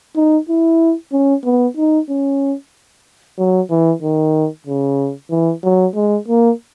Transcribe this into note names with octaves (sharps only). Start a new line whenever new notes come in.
D#4
E4
C#4
B3
D#4
C#4
F#3
E3
D#3
C#3
E3
F#3
G#3
A#3